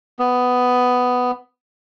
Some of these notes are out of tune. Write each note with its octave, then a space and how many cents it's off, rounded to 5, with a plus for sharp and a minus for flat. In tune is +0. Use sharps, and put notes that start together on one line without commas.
B3 +10